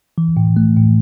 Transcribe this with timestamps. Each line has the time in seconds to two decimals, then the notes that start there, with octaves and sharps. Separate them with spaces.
0.18 E3
0.37 A2
0.57 A3
0.76 A2